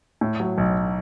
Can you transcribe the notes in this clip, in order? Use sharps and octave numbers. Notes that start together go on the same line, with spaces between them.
A2
F#3
B1